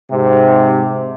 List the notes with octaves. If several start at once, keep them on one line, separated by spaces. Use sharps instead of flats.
G#2 C3